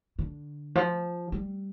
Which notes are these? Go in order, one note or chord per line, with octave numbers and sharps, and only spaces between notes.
D3
F3
G3